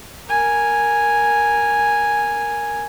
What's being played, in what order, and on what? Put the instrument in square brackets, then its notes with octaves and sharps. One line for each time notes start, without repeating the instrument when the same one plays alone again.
[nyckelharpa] A#4 G#5